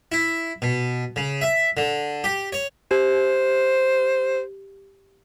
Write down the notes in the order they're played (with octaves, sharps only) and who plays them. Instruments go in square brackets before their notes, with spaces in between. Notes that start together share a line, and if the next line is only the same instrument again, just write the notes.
[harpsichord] E4
B2
C#3
E5
D3
G4
C#5
[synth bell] G4 [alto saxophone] C5